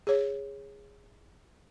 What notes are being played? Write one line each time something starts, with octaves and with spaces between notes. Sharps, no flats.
G#4 C#5